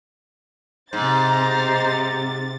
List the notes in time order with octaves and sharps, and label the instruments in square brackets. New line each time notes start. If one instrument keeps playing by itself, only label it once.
[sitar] G#2 [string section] C3 A6 [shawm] C5
[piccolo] A#5